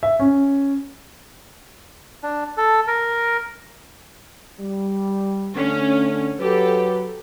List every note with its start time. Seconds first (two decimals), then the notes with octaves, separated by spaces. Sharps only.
0.03 E5
0.19 C#4
2.23 D4
2.57 A4
2.87 A#4
4.60 G3
5.56 D3 A3 C#4
6.40 F#3 G4 A4 B4